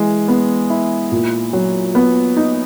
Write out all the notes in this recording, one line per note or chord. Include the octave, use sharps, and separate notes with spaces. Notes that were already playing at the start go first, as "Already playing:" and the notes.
Already playing: E3 G#3
B3
E4
A#2
F#3
B3
D#4